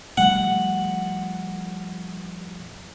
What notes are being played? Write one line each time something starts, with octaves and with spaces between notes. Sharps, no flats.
F3 G3 A3 F#5